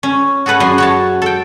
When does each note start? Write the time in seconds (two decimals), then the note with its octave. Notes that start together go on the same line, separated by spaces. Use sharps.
0.03 C#4
0.46 F#4 G#4 A4 B4 F#5
0.60 F#2 F#4 G#5 C6
0.78 F#4 C#5 A5
1.22 A4 G5